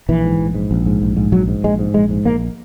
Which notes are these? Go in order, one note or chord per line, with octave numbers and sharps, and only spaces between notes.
A#1 E3
G#2
A#1
G#2
A#1
G#2
A#1
G#2
A#1 F#3
G#2
A#1 G#3
G#2
A#1 G#3
G#2
A#1 A#3